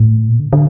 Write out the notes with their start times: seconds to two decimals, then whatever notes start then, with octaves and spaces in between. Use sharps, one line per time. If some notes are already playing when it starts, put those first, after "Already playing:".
Already playing: A2
0.28 A#2
0.40 D3
0.53 D3